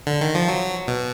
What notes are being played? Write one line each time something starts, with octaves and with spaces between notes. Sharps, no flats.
D3
D#3
F3
F#3
B2